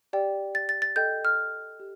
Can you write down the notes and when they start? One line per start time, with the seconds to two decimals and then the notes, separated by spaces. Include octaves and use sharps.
0.13 G4 D5 G5
0.55 A6
0.69 A6
0.82 A6
0.96 A4 D#5 G5 G6
1.25 F6
1.80 G4